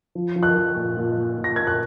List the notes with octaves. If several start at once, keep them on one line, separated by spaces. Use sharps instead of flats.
F3
F3
F#6
F3
A#2
A#2
A#2
A#2
A#6
A#2 G#6
F#6